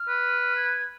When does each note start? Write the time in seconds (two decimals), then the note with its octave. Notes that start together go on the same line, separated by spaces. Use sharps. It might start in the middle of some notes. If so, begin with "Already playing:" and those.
Already playing: F6
0.09 B4
0.57 G#6